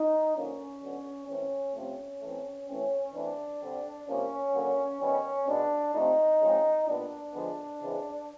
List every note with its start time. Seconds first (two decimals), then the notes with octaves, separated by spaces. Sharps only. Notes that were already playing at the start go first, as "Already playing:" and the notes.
Already playing: D#4
0.35 D3 F3 A#3 C#4
0.82 D3 F#3 B3
1.28 E3 A3 C4 C#4
1.75 C3 F3 A3 C4 C#4
2.22 E3 A3 C4
2.68 E3 A3 C4 C#4
3.14 E3 A3 C4 D4
3.62 D3 G3 C4
4.08 C3 F3 A#3 C#4
4.54 D3 F#3 A#3
5.01 D#3 G3 B3 C#4
5.47 B2 G#3 B3 D4
5.94 C3 F3 A3 C4 D#4
6.41 C#3 F3 G#3 C4
6.87 A#2 G3 B3 D4
7.33 D3 F3 G#3 B3
7.80 C#3 E3 G#3 C4